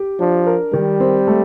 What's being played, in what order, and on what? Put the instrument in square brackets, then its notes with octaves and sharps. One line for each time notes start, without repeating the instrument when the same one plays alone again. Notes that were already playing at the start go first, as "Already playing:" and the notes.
Already playing: [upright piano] G4
[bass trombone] F3 [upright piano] D4
[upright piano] A#4
[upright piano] D#3 [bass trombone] G3
[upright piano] C4
A3